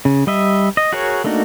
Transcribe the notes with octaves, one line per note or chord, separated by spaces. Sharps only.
C#3
G3 D#5 E5
D#5
F#4 G#4 A#4 C#5
A3 A#3 D4 D#4 F#4